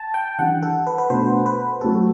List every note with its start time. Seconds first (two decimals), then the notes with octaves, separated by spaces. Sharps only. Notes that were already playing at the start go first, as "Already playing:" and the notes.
Already playing: G5 A5
0.14 G5
0.38 E3 G3 D4 F#5
0.63 A4
0.87 B4
0.98 B4
1.10 B2 A3 D4 A4 C5
1.46 B4
1.81 F#3 A3 C4 G4 A4